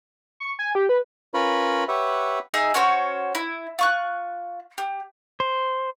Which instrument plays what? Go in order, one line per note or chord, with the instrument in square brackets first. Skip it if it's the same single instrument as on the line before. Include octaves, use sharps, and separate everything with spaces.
[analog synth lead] C#6
G#5
G4
B4
[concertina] C#4 F4 A#4 B4 C#5 B5
G4 B4 C#5 E5 F#5
[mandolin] D#4 G#4 E5 G#5
C#4 F#4 C5 C#5
E4
F4 C#6 F#6
G4
[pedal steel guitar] C5